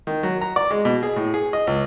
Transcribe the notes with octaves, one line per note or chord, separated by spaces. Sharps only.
D#3
F#3
A#5
D5
G#3
B2
G#4
A2
G#4
D#5
C#2